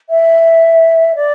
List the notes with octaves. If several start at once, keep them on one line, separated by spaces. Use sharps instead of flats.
E5
D5